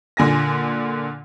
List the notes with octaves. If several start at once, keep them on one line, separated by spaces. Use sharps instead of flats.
A#2 D3 G#5 A#6